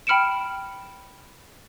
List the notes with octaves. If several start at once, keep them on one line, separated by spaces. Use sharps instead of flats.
G5 B5 F6 C#7 D7 E7